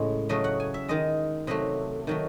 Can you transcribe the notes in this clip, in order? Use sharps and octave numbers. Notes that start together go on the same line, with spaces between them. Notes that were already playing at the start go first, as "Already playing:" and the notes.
Already playing: A2 C#3 G#3
C#3 F#3 A3 D#5
F#5
G#5
E5
D#3 G#3 D#5
C3 F#3 A3 D#5
D#3 F#3 A3